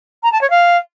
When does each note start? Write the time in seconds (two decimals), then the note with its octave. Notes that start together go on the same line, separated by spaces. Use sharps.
0.23 A#5
0.32 A5
0.41 C#5
0.50 F5